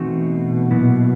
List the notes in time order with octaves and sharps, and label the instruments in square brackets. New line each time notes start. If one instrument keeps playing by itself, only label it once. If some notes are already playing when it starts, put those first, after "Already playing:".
Already playing: [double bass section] B2 [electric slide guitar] E3 A3 C4 D#4 F#4
[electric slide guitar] A#2 F#3 B3 E4